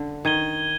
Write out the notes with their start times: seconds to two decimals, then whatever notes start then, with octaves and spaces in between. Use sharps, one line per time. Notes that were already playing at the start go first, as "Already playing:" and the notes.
Already playing: D3
0.25 D#3 G#6 D#7 G7